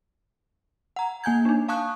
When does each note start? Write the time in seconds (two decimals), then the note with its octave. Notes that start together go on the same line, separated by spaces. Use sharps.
0.96 F#5 A#5
1.24 A#3 G#5 G6 G#6
1.45 D4 D#4
1.68 F5 A5 C#6 D#6 F#6